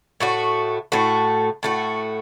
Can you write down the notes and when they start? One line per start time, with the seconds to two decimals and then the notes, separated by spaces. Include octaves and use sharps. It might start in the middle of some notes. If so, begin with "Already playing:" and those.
0.20 A2 A3 F#4
0.92 A2 A3 F#4
1.63 A2 A3 F#4